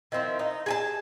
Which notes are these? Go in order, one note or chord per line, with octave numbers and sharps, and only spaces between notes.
D#3 F3 C4 E4
D#4
G#4 G#5 A5